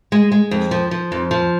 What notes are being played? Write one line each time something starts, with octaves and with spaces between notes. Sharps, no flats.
G#3
G#3
F2
F3
F3
F2
F3